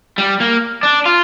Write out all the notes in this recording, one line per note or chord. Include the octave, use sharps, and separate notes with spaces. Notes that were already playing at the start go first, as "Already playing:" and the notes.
G3
A#3
D4
F4